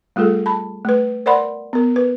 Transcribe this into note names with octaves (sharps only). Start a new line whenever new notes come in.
G3 A3 F4 G#4 A4
A5 B5
A3 B4
A#4 C5 D5 F#5 B5 C6
B3 A#4
B4